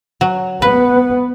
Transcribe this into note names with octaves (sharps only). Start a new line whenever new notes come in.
F#3
B3 B4